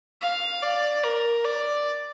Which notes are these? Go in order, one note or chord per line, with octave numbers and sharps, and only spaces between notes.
F5
D5
A#4
D5